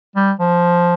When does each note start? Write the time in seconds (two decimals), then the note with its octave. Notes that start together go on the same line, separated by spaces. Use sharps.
0.16 G3
0.40 F3